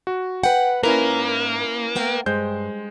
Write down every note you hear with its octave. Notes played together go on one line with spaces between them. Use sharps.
F#4
B4 F#5 G5
G#2 A#3 C#4 E4 A#4 B4
A3 B3 G5
G2 G#3 C5 G6